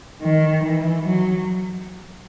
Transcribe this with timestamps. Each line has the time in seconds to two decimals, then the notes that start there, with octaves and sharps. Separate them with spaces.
0.22 D#3
0.65 E3
1.07 F#3